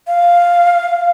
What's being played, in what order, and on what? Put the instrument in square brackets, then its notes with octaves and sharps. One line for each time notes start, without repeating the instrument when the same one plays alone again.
[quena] F5